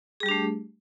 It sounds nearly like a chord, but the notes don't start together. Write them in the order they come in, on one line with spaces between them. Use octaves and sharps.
G#4 G3 G4 D4 A3